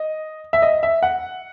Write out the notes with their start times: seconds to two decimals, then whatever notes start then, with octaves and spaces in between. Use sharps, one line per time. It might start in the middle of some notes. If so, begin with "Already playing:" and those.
Already playing: D#5
0.53 E5
0.62 D#5
0.83 E5
1.03 F#5